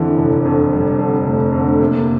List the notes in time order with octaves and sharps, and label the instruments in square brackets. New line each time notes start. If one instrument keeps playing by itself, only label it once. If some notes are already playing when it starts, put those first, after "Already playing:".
Already playing: [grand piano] F2 D3 [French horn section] E3
[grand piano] F1
F2 D3
[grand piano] F1 [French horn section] G3
[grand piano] F2 D3
[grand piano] F1 [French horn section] A3
[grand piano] F2 D3
[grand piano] C3 [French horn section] A#3